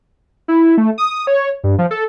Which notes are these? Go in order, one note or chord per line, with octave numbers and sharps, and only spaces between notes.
E4
A3
D#6
C#5
G2
F3
A4